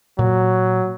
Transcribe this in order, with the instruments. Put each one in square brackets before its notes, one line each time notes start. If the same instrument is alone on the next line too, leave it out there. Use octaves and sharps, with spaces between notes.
[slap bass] A#2 A#3 [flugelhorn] F#3